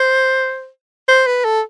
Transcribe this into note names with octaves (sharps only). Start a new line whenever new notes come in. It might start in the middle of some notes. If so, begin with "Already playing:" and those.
Already playing: C5
C5
B4
A4